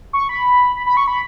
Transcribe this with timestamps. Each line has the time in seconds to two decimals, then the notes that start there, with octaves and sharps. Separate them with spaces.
0.13 C#6
0.29 B5
0.76 B5
0.86 B5
0.97 C#6
1.07 B5